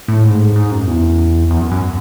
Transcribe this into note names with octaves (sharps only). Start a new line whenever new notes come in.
A2
G#2
G#2
F#2
E2
E2
F#2
F#2